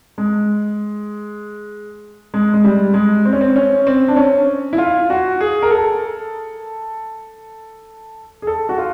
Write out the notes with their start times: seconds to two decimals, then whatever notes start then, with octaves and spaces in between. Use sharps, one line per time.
0.18 G#3
2.34 G#3
2.54 G#3
2.64 G3
2.94 G#3
3.25 C4
3.33 C#4
3.41 C4
3.56 C#4
3.87 C4
4.08 D4
4.17 C#4
4.73 E4
4.78 F4
5.10 F#4
5.41 G#4
5.62 A#4
5.71 A4
8.42 G#4
8.47 A4
8.69 F#4
8.78 F4